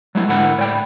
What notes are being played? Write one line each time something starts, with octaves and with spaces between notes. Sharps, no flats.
F#3 G#3 A3 B3 E4
G#2 D3 E4 A#4 F#5 B5
A2 C#5 D5 G5 B5